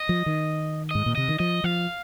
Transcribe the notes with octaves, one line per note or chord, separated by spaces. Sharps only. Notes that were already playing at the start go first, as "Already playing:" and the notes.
Already playing: D#5
F3
D#3
G#2 D#5
A#2
C3 D#5
D#3
F3 D#5
F3 F5